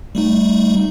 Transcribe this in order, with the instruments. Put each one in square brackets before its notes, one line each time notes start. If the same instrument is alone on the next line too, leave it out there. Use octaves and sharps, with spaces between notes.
[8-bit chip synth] G3 A3 D#4